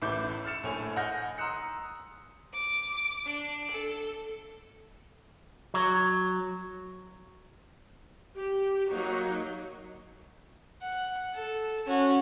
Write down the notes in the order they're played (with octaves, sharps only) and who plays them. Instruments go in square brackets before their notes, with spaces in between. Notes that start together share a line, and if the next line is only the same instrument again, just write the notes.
[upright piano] A1 A2 E5 D6 G6
E6 F6 A6 C#7 E7
A#1 A2 A3 C#5 G#5 F7
D#5 F#5 G#5 F6 G6 A#6
A#5 C6 D#6 E6 F#6 C#7
[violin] D6
D4
A4
[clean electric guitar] F#3
[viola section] G4
F#3 A#3 D#4 F#4
[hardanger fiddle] F#5
A4
C#4 F#4